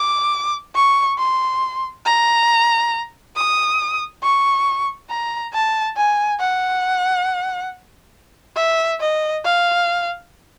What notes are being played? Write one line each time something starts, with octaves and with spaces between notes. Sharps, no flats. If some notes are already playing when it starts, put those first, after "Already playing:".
Already playing: D6
C#6
C6
A#5
D#6
C#6
A#5
A5
G#5
F#5
E5
D#5
F5